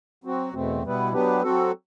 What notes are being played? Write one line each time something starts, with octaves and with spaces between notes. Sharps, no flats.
F#3 C4 F#4
E2 B2 A3 C4
B2 G3 B3 E4 B4
F#3 B3 D4 G4 B4
F#3 C4 F#4 A4